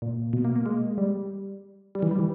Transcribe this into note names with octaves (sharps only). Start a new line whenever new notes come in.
A#2
B2
A#3
A#3
G#3
G3
G3
E3
G3
E3